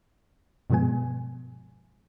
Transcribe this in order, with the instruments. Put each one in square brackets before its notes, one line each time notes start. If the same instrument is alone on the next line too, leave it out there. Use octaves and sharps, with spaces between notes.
[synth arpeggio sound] G2 B2 F3 G#3 B3 G#5